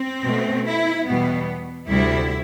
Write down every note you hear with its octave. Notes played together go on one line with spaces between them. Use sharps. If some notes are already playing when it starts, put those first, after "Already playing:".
Already playing: C4
B2 A3
E4
E2 B2 G3 B3
D2 C3 G3 E4